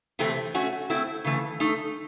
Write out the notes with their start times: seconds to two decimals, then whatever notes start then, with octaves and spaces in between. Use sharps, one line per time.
0.19 C3 E3 A3 C4
0.54 A3 C#4 F#4
0.90 A3 C4 E4
1.25 C#3 E3 A3
1.60 A3 D#4 A4